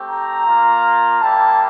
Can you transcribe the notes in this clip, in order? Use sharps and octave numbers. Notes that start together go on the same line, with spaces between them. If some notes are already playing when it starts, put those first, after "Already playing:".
Already playing: A3 C4 G4
A#5
A#3 F4
G3 A#3 E4 G4 A5